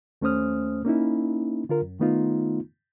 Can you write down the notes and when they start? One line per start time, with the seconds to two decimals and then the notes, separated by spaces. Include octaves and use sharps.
0.21 D#2 A3 C#4 C5 D#6 F6
0.85 A#3 C#4 D#4 E4
1.69 D3 F4 A#4
1.82 F#2
2.00 D#3 A3 B3 D#4 F4